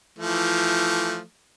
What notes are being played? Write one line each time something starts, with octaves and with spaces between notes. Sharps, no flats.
E3 F3 A3